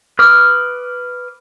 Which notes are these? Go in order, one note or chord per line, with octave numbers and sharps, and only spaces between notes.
B4 D6 D#6 F6